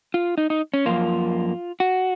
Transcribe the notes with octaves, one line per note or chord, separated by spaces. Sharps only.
F4
D#4
D#4
C#4
F#2 F3 A#3 F4
F#4